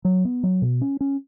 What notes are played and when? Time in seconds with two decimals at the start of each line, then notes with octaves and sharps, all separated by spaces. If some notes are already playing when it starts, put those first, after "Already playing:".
0.05 F#3
0.25 B3
0.43 F#3
0.62 B2
0.81 C#4
1.01 C#4